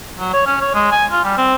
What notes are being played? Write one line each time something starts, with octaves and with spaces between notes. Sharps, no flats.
F#3
C#5
C#4
C#5
G#3
G#5
F4
G3
C4